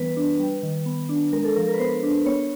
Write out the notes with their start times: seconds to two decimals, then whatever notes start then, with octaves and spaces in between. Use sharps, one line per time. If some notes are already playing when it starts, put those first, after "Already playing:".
Already playing: E3 G3 B3 B4
0.17 D4
0.40 G3
0.63 D#3
0.86 B3
1.09 D4
1.32 G#3 A#4
1.44 A4
1.56 F3 A#4
1.68 A#4
1.74 B4
1.79 B3 C5
2.03 D4
2.26 B3 C#5